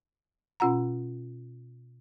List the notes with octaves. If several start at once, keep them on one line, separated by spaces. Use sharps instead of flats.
B2 C#4 F4 F#5 A#5